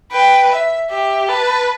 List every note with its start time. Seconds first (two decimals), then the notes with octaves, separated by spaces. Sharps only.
0.12 B4 G5
0.51 E5
0.90 G4 E5
1.28 B4 A5